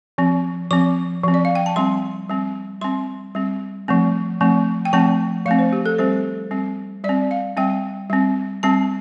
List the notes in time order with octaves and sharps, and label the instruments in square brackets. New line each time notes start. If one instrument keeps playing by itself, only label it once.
[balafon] F3 C4
F3 C4 D6
F3 C4
D5
F5
G5
A5
G3 C4 C6
G3 C4
G3 C4 C6
G3 C4
F3 A3 C4
F3 A3 C4
G5
F3 A3 C4 A5
F3 F5
A3 C4
C5
G4
A4
G3 C4 C5
G3 C4
G3 D5
C4
F5
G3 C4 G5
G3 C4
G3 C4 A5